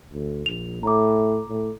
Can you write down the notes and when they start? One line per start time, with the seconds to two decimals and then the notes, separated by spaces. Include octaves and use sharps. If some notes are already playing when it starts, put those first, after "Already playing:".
0.12 D2
0.46 A#1 F7
0.83 A2 A#5 D6
1.48 A2